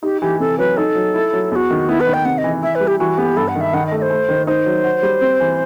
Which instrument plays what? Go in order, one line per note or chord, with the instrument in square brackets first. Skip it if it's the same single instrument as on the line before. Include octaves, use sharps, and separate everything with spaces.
[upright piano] D#4 [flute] G4
[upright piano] E3 [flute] G4
[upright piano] C3 [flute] A4
[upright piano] F#3 [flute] B4
[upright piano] D#4 [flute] A4
[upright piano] F#3
E4
F#3
[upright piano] E2 [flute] F#4 A4
[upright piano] D#3
[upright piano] B3 [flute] E4
[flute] B4
[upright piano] D#3
[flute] G5
[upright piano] C3 [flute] F#5
[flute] D#5
[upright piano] E3
[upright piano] E4 [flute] E5
[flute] B4
[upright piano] G3
[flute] G4
[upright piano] E3 [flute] F#4
[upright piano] B3 [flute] G4
[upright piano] G2 [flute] A4
[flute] F#5
[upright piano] D#3
[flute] E5
[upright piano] D#3 [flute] F#5
[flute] D#5
[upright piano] A3
[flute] D#5
C5
[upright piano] A3
D#3
[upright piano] D#4 [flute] C5
[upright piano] F#3
F#4
G3
C4
E3